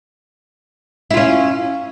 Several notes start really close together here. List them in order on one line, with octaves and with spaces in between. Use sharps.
E4 F4 C#4